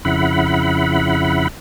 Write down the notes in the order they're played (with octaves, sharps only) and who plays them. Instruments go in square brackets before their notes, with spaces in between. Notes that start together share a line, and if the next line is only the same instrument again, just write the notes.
[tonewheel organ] F2 C#3 E4 F#5 B5